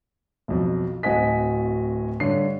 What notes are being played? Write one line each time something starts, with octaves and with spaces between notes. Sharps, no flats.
B1 F2
D1 C4 F#4 D#5 G#5 B6
G2 D3 C#5 C7